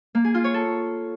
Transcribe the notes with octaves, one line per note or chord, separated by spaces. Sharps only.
A#3
G#4
F4
C#5
A4